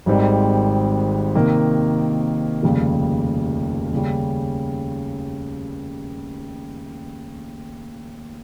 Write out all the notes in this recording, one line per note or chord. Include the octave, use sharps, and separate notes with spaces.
G#1 G#2 D#3 G3 C4
C3 D#3 A#3
F1 D#2 C#3 G3
D#2 C#3 G3 C#4